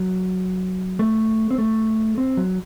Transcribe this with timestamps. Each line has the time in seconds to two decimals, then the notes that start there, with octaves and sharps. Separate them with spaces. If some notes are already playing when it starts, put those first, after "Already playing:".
Already playing: F#3
0.99 A3
1.51 C4
1.58 A3
2.18 C4
2.37 F#3